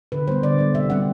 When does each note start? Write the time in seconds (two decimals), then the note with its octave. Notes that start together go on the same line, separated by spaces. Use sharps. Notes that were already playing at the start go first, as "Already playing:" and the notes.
0.12 D3 B4
0.28 G3 B3 C5
0.43 D3 D5
0.59 G3 B3
0.74 C3 E5
0.90 G3 C4 F#5